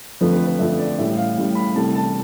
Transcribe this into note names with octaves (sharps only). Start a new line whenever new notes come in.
F2 D3 F3 A3 B4
B4
B4
F2 D3 F3 A3 E5
D5
A1 A2 G3 E5
F5
A1 A2 G3
B5
C2 C3 E3 A3 A5
A5